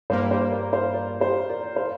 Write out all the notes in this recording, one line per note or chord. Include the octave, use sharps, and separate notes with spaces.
G2 G3 A#3 C5 F5
C5 F5
A#4 D5
C5 F5
A#4 D5
G4 C5
A#4 D5
C5 F5